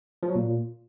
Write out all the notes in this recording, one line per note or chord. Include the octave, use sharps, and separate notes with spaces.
F3
F#3
A#2